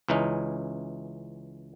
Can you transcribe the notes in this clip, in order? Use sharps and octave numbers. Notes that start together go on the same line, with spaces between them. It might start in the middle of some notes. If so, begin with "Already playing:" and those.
C#2 E3 C#4 D#4